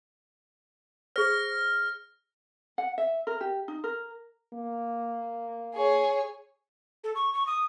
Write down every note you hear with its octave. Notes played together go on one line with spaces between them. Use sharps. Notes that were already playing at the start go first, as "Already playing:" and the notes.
G#4 C5 F6 A#6
F#5
E5
A#4
G4
D#4
A#4
A#3
G#4 C#5
A4
C#6
C#6
D#6